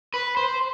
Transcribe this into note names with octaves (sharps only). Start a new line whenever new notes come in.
B4
C5